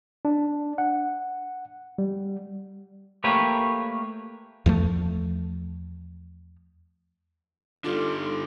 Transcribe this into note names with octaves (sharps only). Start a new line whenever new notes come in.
D4
F#5
G3
A3 A#3 G4 B4 C#5
E2 F3 A3
D3 G3 D#4 F4 A4 D6